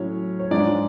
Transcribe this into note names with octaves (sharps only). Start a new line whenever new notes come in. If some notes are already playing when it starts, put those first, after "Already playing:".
Already playing: A2 F#3 C#4
C#5
G#2 F3 G#3 D4 D5